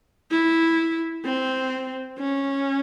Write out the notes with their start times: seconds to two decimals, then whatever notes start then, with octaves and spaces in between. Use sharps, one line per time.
0.31 E4
1.26 C4
2.19 C#4